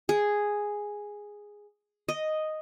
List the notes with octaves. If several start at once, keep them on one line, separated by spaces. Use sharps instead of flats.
G#4
D#5